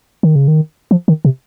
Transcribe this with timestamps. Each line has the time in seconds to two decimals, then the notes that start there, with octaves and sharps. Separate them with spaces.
0.23 D#3
0.36 C#3
0.48 D#3
0.91 F3
1.08 D#3
1.25 C3